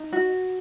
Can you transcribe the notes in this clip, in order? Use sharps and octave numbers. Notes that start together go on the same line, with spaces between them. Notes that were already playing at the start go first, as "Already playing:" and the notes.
Already playing: D#4
F#4